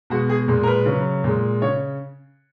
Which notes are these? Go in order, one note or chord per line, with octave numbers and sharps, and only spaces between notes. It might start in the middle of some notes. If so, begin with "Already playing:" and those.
B2 G#3 F#4
G#4
A#2 G#3
A#4
B4
C#3 F#3
A#2 G#3
C#3 C#5